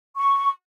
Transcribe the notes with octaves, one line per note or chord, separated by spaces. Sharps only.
C#6